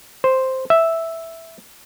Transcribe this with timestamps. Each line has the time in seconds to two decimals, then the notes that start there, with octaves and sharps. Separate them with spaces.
0.24 C5
0.70 E5